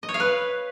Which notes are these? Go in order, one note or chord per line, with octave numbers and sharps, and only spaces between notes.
D#5
C#5
F5
B4